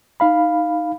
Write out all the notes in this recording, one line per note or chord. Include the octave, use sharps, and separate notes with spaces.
D#4 F5 B5